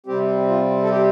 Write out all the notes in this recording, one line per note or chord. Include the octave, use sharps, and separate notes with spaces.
C3 G3 C4 G4
F4
A4
G4